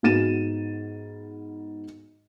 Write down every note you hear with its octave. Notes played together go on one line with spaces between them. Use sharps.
G#2 B3 F#4 A6 D#7 E7